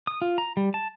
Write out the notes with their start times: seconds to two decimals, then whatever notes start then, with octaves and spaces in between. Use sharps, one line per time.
0.07 D#6
0.22 F4
0.38 A#5
0.57 G3
0.74 A5